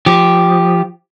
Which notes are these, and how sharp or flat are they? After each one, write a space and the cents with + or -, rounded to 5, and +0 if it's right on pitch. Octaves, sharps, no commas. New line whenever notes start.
F3 -5 G4 +0